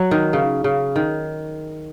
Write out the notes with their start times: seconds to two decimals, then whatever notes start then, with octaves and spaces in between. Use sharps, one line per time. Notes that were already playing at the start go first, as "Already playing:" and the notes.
Already playing: F#3
0.11 D#3
0.33 C#3
0.64 C#3
0.96 D#3